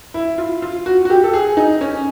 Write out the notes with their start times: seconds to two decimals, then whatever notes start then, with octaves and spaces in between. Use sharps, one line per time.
0.14 E4
0.38 F4
0.62 F4
0.86 F#4
1.05 F#4
1.10 G4
1.23 A4
1.34 G#4
1.57 D#4
1.81 C#4